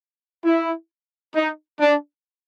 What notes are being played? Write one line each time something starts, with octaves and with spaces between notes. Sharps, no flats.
E4
D#4
D4